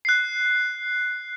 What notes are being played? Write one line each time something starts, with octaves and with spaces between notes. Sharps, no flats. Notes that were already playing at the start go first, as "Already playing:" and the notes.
F#6 C7